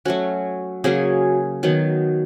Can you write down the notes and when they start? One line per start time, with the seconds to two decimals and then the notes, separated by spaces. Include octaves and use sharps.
0.05 F#3 A3 C#4 F#4
0.84 C#3 F#3 A#3 C#4 G#4
1.63 D#3 F#3 B3